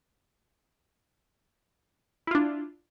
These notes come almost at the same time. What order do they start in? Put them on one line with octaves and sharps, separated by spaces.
E4 F4 D4